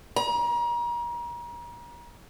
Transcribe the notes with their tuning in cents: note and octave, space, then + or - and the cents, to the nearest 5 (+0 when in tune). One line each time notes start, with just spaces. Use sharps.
A#5 +35